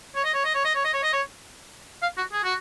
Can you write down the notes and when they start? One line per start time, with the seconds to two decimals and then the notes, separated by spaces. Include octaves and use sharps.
0.16 C#5
0.24 D#5
0.34 C#5
0.45 D#5
0.54 C#5
0.65 D#5
0.75 C#5
0.85 D#5
0.93 C#5
1.03 D#5
1.13 C#5
2.02 F5
2.17 F#4
2.33 G#4
2.44 F#4